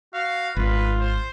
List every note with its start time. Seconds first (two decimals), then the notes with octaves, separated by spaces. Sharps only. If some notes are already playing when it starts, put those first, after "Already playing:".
0.14 F#4 F5
0.57 G#1 F4 B4
1.00 C5